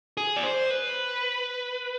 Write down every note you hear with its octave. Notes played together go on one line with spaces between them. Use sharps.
G#4
D5
C5
B4